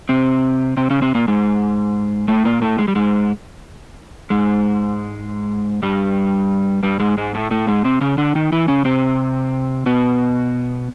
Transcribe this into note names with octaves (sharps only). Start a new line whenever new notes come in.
C3 C4
C3 C4
C#3 C#4
C3 C4
A#2 A#3
G#2 G#3
A2 A3
A#2 A#3
A2 A3
G#3
G3
G#2 G#3
G#2 G#3
G2 G3
G2 G3
G#2 G#3
G#2 G#3
A2 A3
A2 A3
G#2 G#3
C3 C4
C#3 C#4
D3 D4
D#3 D#4
E3 E4
C#3 C#4
C3 C4
B2 B3